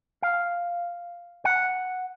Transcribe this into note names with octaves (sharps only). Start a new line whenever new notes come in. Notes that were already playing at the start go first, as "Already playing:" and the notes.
F5
F#5